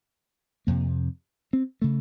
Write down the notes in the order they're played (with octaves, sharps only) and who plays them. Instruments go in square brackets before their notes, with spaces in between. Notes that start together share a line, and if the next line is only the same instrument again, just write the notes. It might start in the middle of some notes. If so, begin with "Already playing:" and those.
[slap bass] F2 C3 A#3
C4
C#3 A3